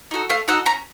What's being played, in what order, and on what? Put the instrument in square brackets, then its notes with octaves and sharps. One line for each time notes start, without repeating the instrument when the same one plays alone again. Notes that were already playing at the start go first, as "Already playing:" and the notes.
[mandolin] D#4 F#4 A4
A3 F5
D#4 F#4 A4 F#5
C#4 A#5